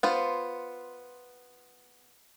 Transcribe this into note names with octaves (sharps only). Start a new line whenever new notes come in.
B3 F4 C5